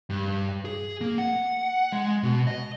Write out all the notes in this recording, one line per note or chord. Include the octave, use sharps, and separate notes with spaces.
G2
G#4
A#3
F#5
G#3
B2
D#5